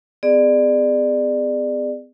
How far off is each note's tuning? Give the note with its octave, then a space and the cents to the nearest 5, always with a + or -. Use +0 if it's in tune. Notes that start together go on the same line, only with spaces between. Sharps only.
B3 +45 G#4 -15 D5 +25